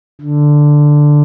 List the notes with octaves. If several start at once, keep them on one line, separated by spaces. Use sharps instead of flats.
D3